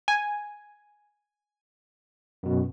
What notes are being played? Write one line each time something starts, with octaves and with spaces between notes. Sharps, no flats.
G#5
F#2 B2